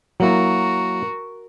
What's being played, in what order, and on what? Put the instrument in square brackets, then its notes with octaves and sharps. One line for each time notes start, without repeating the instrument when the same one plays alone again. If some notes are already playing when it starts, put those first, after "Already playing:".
[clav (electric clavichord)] F#3 A#3 E4 [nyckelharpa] F#4 A#4